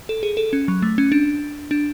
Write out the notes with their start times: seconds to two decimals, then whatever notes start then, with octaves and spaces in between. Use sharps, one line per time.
0.09 A4
0.23 G#4
0.37 A4
0.53 C#4
0.68 F#3
0.82 A3
0.98 C#4
1.12 D4
1.71 D4